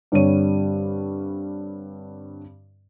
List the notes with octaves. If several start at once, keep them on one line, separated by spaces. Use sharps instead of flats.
G2 D3 G3 C4 C#5 D#7